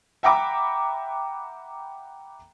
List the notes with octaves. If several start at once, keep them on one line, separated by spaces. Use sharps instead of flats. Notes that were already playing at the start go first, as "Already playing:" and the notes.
E5 F#5 G5 A#5 B5 D6